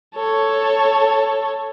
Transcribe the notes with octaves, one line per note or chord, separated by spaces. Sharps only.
A4 C#5